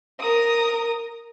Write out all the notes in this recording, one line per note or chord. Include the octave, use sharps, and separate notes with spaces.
A#4 D#6